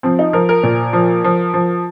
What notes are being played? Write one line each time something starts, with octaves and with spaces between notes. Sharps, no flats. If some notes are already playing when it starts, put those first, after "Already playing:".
F3 C4
D#4
F3 A#4
A#4
A#2
F3
F3
F3